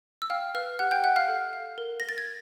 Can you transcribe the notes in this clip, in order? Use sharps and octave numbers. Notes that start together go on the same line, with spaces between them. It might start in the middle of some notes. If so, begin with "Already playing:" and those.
E6
F5 G5 F6
B4 F5 F6
G4 F#5 F#6
G5 G6
E5 F#5 F#6
F5 F6
A4
F5
A#4
A#4 A#6
A6
G#6